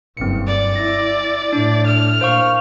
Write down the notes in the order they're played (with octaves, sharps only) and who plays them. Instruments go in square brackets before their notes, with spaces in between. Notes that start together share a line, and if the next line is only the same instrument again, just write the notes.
[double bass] F#1 G2 [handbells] C4 C#7
[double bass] G2 [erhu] D5
[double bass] E4 [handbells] A#6
[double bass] A2 [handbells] D4
[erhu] F6
[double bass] A#2 [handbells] C5 F5 C#6